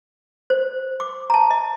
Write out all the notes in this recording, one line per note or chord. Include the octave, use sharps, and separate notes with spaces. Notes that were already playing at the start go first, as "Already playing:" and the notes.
C5
D6
A5 A#5
D#5